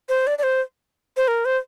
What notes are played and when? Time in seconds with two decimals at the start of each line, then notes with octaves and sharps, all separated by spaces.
0.09 C5
0.27 D5
0.38 D5
0.43 C5
1.17 C5
1.28 A#4
1.45 C5